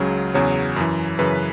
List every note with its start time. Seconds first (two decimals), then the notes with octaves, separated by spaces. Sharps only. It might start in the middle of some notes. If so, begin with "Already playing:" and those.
Already playing: C#2 C#3 F#3
0.34 E2 C#3 F#3 C#5
0.76 F#2 E3
1.19 F#2 C#3 E3 B4